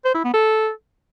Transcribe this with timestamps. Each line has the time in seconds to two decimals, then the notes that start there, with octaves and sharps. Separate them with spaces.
0.05 C5
0.14 E4
0.24 B3
0.34 A4